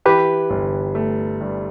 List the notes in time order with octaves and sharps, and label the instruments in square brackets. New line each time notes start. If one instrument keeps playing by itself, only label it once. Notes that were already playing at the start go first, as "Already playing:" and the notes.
[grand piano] E3 [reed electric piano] G4 B4
[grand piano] G1
A3
G2